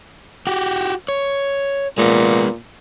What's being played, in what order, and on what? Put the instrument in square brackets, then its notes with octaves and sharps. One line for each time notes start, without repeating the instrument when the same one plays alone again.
[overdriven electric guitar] F#4 G4
C#5
[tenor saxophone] A#2 [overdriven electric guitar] G#3 B3